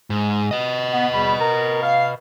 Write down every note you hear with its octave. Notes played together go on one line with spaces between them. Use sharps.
G#2
B4 D#5
B3
E2 G3 B5
A#4 A#5
F5